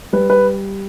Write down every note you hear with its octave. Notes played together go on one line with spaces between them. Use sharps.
G3 B4
B4